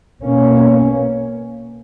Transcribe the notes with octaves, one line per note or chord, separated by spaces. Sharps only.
B2 A#3 C#4